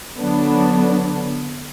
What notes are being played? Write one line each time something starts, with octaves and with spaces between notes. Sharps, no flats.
D3 F#3 B3 D4